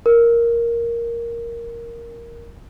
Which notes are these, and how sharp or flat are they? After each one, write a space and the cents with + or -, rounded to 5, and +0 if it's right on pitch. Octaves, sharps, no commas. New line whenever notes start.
A#4 +5